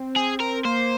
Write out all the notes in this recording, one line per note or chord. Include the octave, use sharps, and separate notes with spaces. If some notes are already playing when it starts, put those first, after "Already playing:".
Already playing: C4
G#4
A#4
A#3 C5